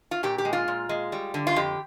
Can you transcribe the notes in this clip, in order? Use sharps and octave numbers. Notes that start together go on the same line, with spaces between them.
F4
A#2 G4
G4
G#3
F4
A#2
G#3
G3
D3
F4
F2 G4